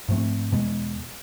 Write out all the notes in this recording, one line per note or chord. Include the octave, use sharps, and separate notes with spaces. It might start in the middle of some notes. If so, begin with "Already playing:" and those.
G#2 F3 A3 C4
E2 B2 G#3 B3